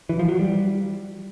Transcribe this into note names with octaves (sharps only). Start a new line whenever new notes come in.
E3
F3
F#3
G3